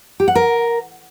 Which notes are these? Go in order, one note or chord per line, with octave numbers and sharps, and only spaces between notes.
G4
F#5
A#4